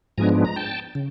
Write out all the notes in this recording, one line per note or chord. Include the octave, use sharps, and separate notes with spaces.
G#2 F3 G#3 B3 D4 G#5 A#5
A#5
G5 A5
C#3